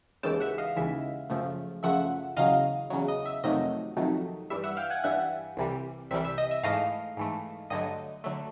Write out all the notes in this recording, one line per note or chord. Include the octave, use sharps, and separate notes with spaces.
D#2 C#3 E3 G#3 G5 A5
E5 F#5
D#5 F5
D#2 C#3 E3 G#3 E5
F#2 C#3 F3 A3
F#2 C#3 F3 A3 E5 F#5
E2 C#3 F#3 D#5 F5
E2 C#3 F#3
D#5
E5
F2 C3 D#3 F#3 A3 D#5
F2 C3 D#3 F#3 A3
G2 E3 G3 E5
E5 F#5
F5 G5
F#5 G#5
G2 E3 G3 E5 F#5
C2 C3 E3 G3
C2 C3 E3 G3 E5
E5
D#5
E5
G#2 E3 A3 D#5 F5
G#2 E3 A3
G2 D3 F#3 A3 D#5
D3 F#3 A3